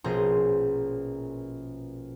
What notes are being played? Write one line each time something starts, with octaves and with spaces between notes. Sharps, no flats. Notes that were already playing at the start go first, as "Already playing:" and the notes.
A#1 B2 C#4 G#4 C5 A#5